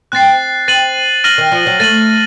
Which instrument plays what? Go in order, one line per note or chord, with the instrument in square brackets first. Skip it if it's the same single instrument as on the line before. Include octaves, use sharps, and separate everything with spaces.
[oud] C4 [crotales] F#6 A6 C7
[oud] C4 [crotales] A6 D#7 F#7
[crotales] F6 A#6 D#7 F#7
[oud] D#3
F3
F#3
[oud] A3 [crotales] A6 D#7 F#7